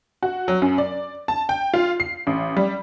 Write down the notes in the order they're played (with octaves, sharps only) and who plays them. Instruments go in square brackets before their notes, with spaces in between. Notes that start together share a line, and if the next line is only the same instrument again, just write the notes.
[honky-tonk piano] F#4
F#3
F#2
D5
A5
G5
F4
C7
A1
G3